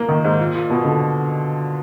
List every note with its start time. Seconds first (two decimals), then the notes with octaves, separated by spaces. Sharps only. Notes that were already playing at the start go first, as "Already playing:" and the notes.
Already playing: A#3
0.09 D#3
0.24 G#2
0.39 A#2
0.55 A#2
0.70 B2
0.85 D3